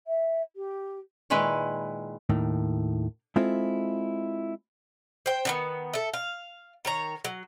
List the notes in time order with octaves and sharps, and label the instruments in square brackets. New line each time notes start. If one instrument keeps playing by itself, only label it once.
[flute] E5
G4
[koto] A#2 D#3 G#3 E4 B4
[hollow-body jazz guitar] D#2 A2 D#3
G#3 C4 E4 F4 A4
[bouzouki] C5 G5
D3 D#3 B3
A4 E5
F5
D#3 C#5 A#5
F#3